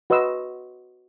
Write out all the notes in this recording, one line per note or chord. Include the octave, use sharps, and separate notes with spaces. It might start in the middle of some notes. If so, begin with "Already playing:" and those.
F#4 B4 D#5 C6 E6